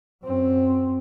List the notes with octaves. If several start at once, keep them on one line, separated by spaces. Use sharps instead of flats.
F#2 C4